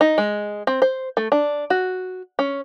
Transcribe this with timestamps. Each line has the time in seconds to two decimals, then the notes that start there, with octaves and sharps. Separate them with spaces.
0.01 D#4
0.18 G#3
0.67 C4
0.82 C5
1.17 A3
1.32 D4
1.70 F#4
2.39 C#4